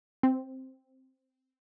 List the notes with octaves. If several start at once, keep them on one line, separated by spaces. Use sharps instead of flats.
C4